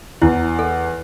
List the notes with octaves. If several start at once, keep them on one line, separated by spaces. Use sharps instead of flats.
E2 E4
A4